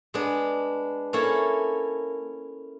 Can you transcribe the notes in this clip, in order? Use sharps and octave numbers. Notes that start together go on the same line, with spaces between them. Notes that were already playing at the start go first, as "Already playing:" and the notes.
G#3 B3 D4
A#3 C#4 E4 A4 C#5